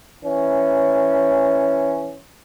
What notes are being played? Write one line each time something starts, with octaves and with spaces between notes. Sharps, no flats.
E3 C#4